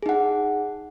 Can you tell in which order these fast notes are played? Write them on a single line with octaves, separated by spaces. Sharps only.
G#4 D#4 F#5